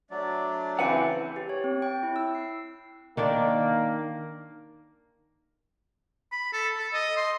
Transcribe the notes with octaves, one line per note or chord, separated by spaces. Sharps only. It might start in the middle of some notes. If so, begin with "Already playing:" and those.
F#3 A3 D4 D5
C#3 E3 C4 E4 B4 F#5
G4
C#5
C4
G5
E4
E6
C7
D#3 A#3 D4 D5
B5
A4
A4
D#5
C6